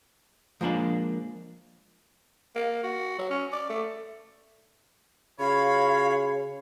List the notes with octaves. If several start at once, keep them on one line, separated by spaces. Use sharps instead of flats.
F3 G#3 A#3 D4 D5
A#3
F#4
F#3
C#4
D5
A3
C#3 F4 F#4 C#5 F5 B5